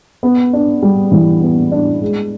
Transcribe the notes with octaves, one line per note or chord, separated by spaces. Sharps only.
B3
D4
G3
E3
B3
D4
G#3